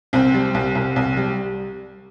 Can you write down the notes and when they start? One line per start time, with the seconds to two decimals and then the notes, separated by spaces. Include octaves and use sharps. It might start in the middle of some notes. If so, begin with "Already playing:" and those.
0.13 C2 C4
0.34 G3
0.54 C2
0.75 C2
0.96 C2
1.17 G3